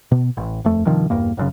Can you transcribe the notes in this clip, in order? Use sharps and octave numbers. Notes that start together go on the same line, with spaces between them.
B2
A1
D#1 F2 A3
G2 C3 D#3 F3
E1 E2 G2 A#3
F1 F#2 C#3